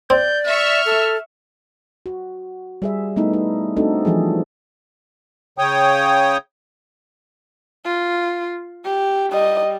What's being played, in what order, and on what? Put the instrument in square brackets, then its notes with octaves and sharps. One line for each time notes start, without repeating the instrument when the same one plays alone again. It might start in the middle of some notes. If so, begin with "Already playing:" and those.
[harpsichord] C4 [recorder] D5 [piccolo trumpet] G6
[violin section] E5 C#6 [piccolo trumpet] F6
[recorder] A4
[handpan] F#4
G3 G#4 E5
G3 A3 B3 D#4 E4
D#4
A3 C4 D4 D#4 F#4 A4
E3 F3 G3 G#4
[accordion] C#3 C#5 G5 D#6
[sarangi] F4
G4
[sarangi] G3 [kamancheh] D#5